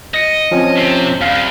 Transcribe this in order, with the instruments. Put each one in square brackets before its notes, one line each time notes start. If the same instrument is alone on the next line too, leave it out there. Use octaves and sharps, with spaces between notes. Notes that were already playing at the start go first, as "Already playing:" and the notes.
[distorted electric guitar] D#5 [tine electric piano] A#6 C#7
[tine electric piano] F3 C4 C#4
[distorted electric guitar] C3
[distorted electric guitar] C2 F#2 [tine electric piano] F5